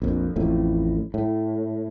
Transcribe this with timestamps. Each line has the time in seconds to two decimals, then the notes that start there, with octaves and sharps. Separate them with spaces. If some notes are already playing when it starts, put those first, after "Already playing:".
0.02 A#1 F2
0.36 A1 F2 A2
1.14 A2